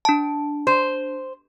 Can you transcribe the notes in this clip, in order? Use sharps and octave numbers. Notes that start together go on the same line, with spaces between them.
D4 A5
C5